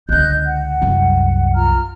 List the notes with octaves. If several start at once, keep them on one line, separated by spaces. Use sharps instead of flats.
C#2 D3 D#5 F#6 G6
F#5
C2 F#2
F4 A#5 F6